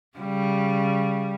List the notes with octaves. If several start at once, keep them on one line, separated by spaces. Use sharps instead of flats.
C#3 G3